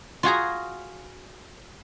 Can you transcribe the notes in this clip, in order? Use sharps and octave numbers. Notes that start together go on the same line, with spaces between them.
F4 F#4 G#4 A#5